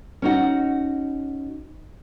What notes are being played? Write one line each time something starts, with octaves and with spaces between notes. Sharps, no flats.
C#4 D#4 F#4